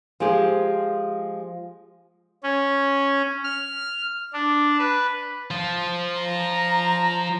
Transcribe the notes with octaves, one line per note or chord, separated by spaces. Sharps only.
F3 G#3 G4 G#4
C#4
F6
D4
B4
F3 F4
A#5